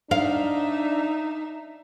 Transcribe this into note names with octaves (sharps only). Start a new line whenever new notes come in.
D4 D#4 E5 F5